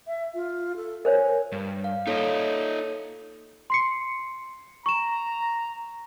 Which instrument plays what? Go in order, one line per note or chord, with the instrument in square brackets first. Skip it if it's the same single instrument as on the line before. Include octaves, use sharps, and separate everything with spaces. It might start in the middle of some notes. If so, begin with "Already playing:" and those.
[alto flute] E5
F4
A4
[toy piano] A#4 C5 C#5 [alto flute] G#5
[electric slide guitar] G2
[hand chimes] F5
[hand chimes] A#3 A4 C#5 [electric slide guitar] D#4 F4 D#5
[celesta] C6 C7 C#7
[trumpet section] A#5 [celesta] C#6 E7